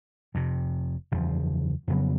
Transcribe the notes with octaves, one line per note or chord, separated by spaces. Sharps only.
F1 F2 C3
F#1 E2 C#3 F3
F2 C#3 F#3 B3